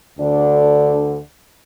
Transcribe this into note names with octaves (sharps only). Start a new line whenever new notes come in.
D2 D3 D4